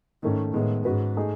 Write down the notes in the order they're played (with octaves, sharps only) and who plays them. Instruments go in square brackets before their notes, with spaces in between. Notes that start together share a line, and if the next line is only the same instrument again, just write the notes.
[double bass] G#2 [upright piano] D#3 A3 C#4
[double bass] A2 [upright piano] D#3 G#3 B3
[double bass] G#2 [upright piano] G#3 C#4 F#4 B4
[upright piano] A3 D#4 G#4